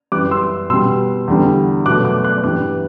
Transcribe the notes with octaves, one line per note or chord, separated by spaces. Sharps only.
F#2 E3 G3 D6 F#6
C6 E6
B2 G3 C6 E6
E2 D3 G3
B2 F#3 A3 D6 F#6
D6 F#6
D6 F#6
G2 E3 G3 D6 F#6